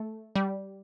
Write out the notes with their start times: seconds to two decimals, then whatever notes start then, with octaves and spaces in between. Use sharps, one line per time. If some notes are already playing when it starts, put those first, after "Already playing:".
Already playing: A3
0.36 G3